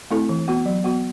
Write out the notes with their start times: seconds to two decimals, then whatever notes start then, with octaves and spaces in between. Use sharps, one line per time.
0.11 A3 C4 E4 A4
0.29 E3
0.48 B3 F#4
0.66 F#3
0.84 B3 F#4